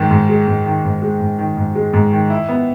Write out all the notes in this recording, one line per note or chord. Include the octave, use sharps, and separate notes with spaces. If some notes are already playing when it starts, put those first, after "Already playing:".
Already playing: G#2 D#3 G#3
G#2
G#3
G#2
D#3
G#2
G#3
G#2
D#3
G#2
G#3
G#2
D#3
E4
B3